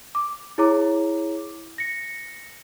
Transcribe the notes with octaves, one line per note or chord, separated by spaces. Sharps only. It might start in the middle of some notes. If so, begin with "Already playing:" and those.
D6
E4 G#4 C#5 A#5 D6
A#6 C#7